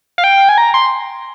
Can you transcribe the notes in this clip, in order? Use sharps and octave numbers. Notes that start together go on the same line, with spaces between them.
F5
G5
G#5
A#5
C6